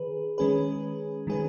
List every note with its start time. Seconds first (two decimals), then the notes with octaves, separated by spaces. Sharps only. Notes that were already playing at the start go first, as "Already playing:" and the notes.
Already playing: D#3 G#4 B4
0.38 D#3 G#3 C#4 G#4 B4
1.27 D#3 G#3 C#4 G#4 B4